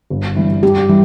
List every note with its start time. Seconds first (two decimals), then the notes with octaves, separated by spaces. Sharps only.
0.10 G1
0.36 G2 E3
0.63 G2 G4
0.89 E3 G3